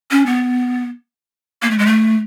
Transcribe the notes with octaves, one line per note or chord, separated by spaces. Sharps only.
C#4
B3
A#3
A3
G#3
A3